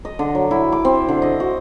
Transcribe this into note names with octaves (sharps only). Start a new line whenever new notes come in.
D#5
D3
F#3
E4
D6
C4
D3
D#5
F#4